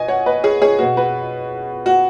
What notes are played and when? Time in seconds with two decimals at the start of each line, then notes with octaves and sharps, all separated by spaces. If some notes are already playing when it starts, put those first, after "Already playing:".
Already playing: B2 D#5 G#5
0.08 C#5 F#5
0.26 B4 D#5
0.44 G#4 C#5
0.62 G#4 C#5
0.79 B2 B3 F#4
0.97 F#4 B4
1.86 F#4